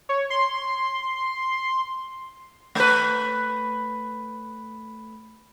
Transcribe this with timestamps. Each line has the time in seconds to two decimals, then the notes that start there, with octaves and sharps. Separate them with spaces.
0.09 C#5
0.30 C6
2.75 A3 B4